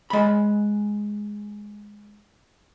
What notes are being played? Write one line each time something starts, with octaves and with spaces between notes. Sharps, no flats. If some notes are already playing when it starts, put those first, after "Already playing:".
G#3 B5